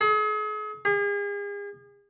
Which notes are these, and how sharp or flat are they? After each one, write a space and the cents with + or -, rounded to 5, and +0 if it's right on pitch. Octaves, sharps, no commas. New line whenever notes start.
G#4 +40
G#4 -40